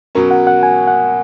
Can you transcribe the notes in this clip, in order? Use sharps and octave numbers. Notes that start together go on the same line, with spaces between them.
B2 F#3 C#4 A#4
F#5
F#5
G#5
F#5